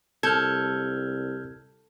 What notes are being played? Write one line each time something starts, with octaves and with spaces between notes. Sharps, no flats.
C2 A4 F6 G6 G#6